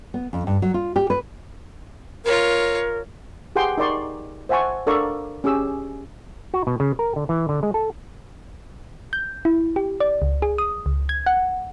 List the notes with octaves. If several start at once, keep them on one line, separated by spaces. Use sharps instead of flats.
B3
F2
G2
F#3
F4
G4
B4
F4 A#4 C#5
G4 G#4 B4 F#5 G5 C6
D#4 A#4 D5 C6 C#6
C5 E5 F#5 G#5 A5 C#6
D4 A4 A#4 D5 F5 C#6
C#4 G4 G#4 E6
F#4
B2
C#3
A#4
D3
E3
D3
G#3
A4
G6
E4
G4
D5
C#2
G#4
D#6
C#2
G#6
F#5